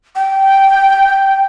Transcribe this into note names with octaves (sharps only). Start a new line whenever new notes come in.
G5